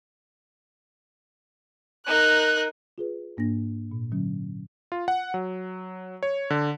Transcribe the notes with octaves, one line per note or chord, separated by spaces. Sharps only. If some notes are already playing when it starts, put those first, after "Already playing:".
D#4 A#4 F#6
F4 G#4 B4
G#2 A#3 D4 A#6
A#2
D3 F#3 C#4
F4
F#5
F#3
C#5
D3